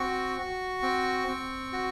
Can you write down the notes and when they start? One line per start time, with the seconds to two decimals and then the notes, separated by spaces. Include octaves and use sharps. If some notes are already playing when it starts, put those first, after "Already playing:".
Already playing: C4 F#4 C#6
0.38 F#4
0.82 C4
1.27 C4
1.72 F#4